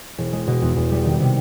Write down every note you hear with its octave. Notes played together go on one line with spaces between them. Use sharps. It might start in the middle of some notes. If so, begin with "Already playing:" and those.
E1
G#3
B2
E2
E2
G3
D#3
C3